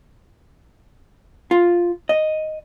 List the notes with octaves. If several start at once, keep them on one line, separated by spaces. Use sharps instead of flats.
F4
D#5